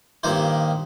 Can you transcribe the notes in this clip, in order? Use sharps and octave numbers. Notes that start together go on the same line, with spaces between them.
G2 A#2 D#3 C5